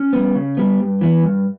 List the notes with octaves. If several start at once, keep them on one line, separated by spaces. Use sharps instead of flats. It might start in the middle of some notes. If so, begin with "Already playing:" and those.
Already playing: C#4
G3 B3
C#3
G3 B3
G2
E3 B3
G2